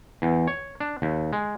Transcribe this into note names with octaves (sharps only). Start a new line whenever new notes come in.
E2
C#5
D4
D#2
G#3